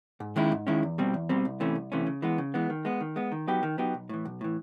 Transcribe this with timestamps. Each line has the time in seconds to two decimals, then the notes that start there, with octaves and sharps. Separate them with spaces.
0.20 G#2
0.36 D#3 G#3 C#4 E4
0.52 G#2
0.67 D#3 G#3 C#4 E4
0.83 E2
0.98 B2 G3 C4
1.14 E2
1.29 B2 G3 C4
1.45 C2
1.60 C3 E3 A3 C#4
1.75 C2
1.92 C3 E3 A3 C#4
2.07 C#3
2.22 E3 G#3 B3
2.38 C#3
2.54 E3 G#3 B3
2.70 D#3
2.85 G#3 B3
3.01 D#3
3.16 G#3 B3
3.32 D#3
3.47 F#3 B3 D#4 G4
3.63 D#3
3.78 F#3 B3 D#4 G4
3.94 B1
4.09 A2 E3
4.25 B1
4.41 A2 E3